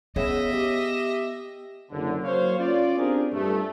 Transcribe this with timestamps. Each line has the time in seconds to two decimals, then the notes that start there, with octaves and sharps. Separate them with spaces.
0.16 C#3 B3 D#5 E5
0.52 G4
1.91 F#1 D3
2.24 F#3 A#3 A#4 C5 C#5 F5
2.59 C#4 F4 D5
2.98 C4 D4 F4 G4 G#4 A#4
3.33 G2 A3